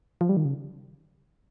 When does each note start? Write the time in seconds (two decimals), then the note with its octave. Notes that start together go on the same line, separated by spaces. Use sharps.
0.21 F3
0.29 G3
0.37 D#3
0.45 C#3